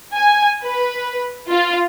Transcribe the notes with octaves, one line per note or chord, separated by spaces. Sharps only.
G#5
B4
F4